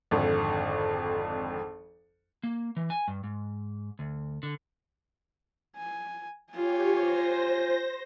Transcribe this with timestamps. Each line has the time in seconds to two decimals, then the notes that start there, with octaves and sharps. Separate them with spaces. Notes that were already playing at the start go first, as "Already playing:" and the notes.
0.11 G#1 F2 D3
2.43 A#3
2.77 E3
2.90 G#5
3.08 G2
3.24 G#2
3.99 D2
4.43 D3
5.76 G#5
6.53 F4 G4 C#5 G#5
6.94 C5 A#6